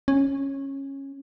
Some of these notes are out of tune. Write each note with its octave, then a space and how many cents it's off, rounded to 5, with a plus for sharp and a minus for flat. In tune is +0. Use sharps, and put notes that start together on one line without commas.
C#4 -15